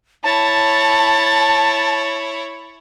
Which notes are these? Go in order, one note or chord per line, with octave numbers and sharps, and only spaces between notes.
E4 C#5 A5 A6